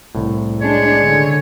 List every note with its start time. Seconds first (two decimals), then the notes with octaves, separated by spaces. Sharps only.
0.15 C2 A2
0.62 G#3 D4 C#5
1.05 D3